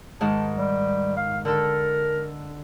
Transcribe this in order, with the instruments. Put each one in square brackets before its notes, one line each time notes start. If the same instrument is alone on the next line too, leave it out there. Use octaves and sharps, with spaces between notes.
[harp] G#2 D#3 [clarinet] A5
[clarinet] G3
F5
[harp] D3 A4 [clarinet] A#4